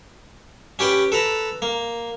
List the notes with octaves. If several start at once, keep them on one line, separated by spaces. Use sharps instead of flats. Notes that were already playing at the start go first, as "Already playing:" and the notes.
C#4 G4 B4 G5
A4 B4 A#5
A#3